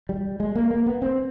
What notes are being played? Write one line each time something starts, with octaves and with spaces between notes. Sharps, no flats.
G3
G#3
A#3
A#3
B3
C4